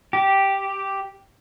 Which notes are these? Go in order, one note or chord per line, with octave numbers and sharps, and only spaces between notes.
G4